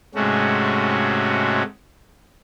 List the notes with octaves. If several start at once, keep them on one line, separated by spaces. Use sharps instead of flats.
G#2 C3 G#3 A3 C#4 F#4